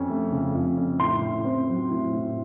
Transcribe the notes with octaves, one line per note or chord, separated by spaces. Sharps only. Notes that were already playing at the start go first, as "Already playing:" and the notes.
Already playing: F2 C#4
A3
C#3
F2
C#4
A2 C6
A2
C4
F#3
A2
A2